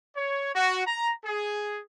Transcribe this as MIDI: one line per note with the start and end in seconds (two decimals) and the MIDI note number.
0.16 0.52 73
0.54 0.83 66
0.86 1.12 82
1.24 1.80 68